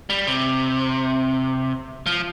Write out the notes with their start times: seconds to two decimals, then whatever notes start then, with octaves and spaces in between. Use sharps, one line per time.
0.10 G3
0.27 C3
2.06 F3